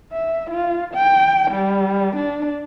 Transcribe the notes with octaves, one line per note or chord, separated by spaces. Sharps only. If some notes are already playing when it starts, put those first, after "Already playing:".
E5
F4
G5
G3
D4